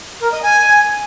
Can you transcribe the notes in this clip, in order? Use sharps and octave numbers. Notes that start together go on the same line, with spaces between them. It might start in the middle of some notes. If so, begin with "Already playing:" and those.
A#4
D#5
G#5